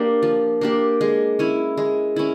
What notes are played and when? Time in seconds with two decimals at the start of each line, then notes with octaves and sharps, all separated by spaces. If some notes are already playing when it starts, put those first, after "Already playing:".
Already playing: A#3 D4 G4
0.23 F3
0.61 A#3 D4 G4
1.01 G#3
1.39 C#4 E4
1.77 G#3
2.16 C#4 E4